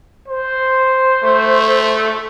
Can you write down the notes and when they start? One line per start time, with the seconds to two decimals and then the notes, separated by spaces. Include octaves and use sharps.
0.28 C5
1.23 A3